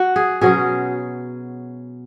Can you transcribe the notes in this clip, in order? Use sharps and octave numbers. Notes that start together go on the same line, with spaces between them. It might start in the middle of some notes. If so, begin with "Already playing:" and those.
Already playing: F#4
G#4
B2 F#3 C#4 G#4